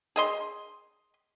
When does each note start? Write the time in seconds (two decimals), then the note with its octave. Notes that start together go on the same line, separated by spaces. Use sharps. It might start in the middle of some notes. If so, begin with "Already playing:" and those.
0.16 G#4 D#5 C6